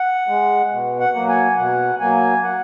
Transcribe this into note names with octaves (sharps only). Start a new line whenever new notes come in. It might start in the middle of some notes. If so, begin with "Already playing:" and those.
Already playing: F#5
G#3
B2
F#5
F#3 A#3
G#5
B2 F#5
F#3 A#3 G#5
F#5